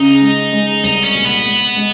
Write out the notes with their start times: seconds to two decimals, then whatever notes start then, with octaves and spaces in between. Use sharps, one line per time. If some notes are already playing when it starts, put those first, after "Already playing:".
Already playing: C#3 D#4
0.22 G#3
0.53 G#3
0.83 C2 D#4
1.04 C#4
1.15 A#2
1.25 B3
1.45 G#3
1.76 G#3